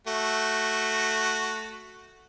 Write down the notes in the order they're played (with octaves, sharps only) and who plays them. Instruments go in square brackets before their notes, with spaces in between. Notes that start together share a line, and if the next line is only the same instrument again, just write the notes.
[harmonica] A3 F#4